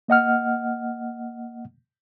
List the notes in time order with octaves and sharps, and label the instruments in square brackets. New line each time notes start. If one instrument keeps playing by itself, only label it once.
[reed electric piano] A#3 D#5 F#5 F6